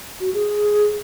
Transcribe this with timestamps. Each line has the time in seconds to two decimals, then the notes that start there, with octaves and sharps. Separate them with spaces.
0.20 F#4
0.34 G#4